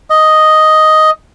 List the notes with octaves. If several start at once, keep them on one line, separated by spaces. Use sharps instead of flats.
D#5